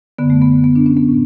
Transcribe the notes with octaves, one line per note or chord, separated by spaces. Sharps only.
F#2 D3 B3
A3
B3
B3
D4
C#4
B3
A2